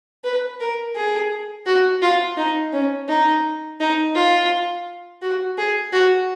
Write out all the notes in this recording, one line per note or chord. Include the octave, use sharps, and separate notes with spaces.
B4
A#4
G#4
F#4
F4
D#4
C#4
D#4
D#4
F4
F#4
G#4
F#4